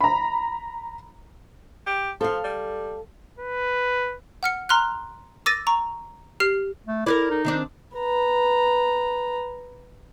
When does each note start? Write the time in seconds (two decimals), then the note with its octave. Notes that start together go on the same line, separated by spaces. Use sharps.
0.01 A#5 B5
1.86 G4
2.21 F3 A4 F5
2.44 G3
3.39 B4
4.43 F#5 F6 C#7
4.69 A#5 C6 F6 F#6
5.46 D6 E6 A6 A#6 D#7
5.67 A#5 C#6
6.40 G4 F6 C7
6.87 A3
7.06 E4 A#4 B4 D5
7.31 D#4
7.45 D#3 C4 D4
7.96 B4 A#5